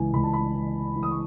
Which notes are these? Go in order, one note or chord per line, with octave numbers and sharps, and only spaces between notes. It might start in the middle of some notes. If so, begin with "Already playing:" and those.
Already playing: C#2 E3 G#5
C#2 B5
A5
B5
E3
E3
D#6
C#6